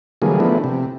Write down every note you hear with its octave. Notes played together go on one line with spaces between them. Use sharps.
D3 E3 F#3 G3 A#3 G#4
F3 A3 B3 D4 E4
C3